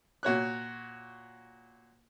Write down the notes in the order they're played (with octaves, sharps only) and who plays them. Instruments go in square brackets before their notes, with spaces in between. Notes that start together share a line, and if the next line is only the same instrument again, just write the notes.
[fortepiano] A#2 F#4 C#5 F#6